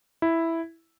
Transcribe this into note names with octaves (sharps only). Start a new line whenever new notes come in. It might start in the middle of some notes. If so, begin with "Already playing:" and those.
E4